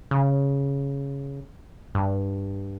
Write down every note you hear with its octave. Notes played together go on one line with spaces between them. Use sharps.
C#3
G2